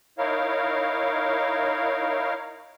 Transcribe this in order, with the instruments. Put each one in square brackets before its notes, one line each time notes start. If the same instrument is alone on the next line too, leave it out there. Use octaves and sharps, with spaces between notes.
[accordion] D#4 E4 A#4 C#5 F5